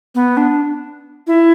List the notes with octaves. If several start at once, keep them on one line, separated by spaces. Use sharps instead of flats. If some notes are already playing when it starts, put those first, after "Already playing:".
B3
D4
E4